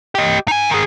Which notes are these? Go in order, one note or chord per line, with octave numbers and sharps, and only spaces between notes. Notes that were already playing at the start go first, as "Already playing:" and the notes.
G4 D#5
D#4 G#5
D#3 G#4